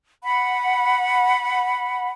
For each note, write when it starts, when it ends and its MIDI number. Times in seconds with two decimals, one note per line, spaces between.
0.23 2.11 78
0.23 2.11 83